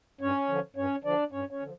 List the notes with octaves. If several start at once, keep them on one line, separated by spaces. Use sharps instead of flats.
G2 C#4 C#5
D3 F3
G2 C#4 C#5
D3 F3 D4 D5
G2 C#4 C#5
C#4 C#5
D3 F3